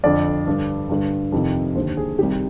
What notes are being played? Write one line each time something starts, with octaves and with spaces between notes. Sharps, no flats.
F2 D3 D5
G2 D3
G2 D3
F2 C3 D#3
D#2 D3 C5
G#4
C2 C3 D#3 G4